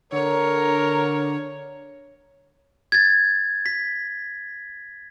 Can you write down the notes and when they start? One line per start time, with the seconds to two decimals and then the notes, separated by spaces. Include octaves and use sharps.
0.12 D3 A#4 C#5
2.92 G#6 A6
3.66 B6